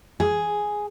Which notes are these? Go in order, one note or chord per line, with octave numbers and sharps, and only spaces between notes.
G#4